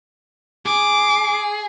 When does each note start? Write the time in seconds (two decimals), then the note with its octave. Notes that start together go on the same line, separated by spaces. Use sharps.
0.66 G#4 D6